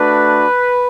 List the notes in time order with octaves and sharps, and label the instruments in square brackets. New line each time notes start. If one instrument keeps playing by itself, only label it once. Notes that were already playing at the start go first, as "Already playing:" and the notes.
Already playing: [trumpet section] A3 D4 F#4 B4